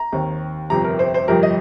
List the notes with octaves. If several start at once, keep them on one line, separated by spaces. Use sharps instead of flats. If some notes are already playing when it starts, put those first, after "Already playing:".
Already playing: A#5
D#2 D#3 C4
G1 F2 C3 G3 A#5
A#4
C5
C5
G1 F2 C3 G3 A#4
D#5